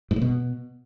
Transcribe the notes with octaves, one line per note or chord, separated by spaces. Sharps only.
G#2
A2
B2